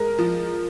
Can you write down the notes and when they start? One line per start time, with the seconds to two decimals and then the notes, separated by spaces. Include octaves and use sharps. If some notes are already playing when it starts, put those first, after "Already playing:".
Already playing: G#3 A#4
0.19 F3